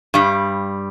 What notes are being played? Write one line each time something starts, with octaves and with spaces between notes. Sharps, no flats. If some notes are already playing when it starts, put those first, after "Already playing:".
G2 G3